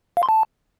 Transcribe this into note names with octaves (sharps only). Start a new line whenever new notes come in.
F5
C6
A5